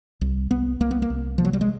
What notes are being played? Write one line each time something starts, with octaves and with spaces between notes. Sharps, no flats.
C2
C2 B3
C2 A#3
B3
A#3
C2
C3 F3
F#3
G3
G#3